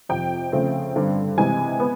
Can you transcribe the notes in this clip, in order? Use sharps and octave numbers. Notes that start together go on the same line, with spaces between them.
F2 C3 F3 G5
C#3 F3 A3 C4
G2 D3 G3 C4
C3 E3 G#3 G#5
B3